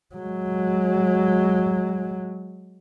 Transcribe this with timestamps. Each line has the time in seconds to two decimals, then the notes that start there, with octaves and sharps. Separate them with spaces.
0.15 F#3 G#3